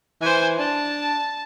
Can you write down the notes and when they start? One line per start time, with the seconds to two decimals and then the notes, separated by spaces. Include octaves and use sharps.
0.22 E3 C5 G#5
0.59 D4 A5